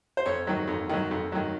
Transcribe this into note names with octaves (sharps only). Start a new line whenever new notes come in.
C5
F2 C#5
D#3 F#3
F2
D#3 F#3
F2
D#3 F#3